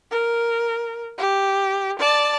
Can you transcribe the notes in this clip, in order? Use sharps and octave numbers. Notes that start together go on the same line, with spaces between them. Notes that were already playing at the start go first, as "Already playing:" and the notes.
A#4
G4
D5 A5